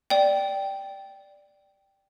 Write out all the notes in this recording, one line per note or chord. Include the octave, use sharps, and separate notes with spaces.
D5 G5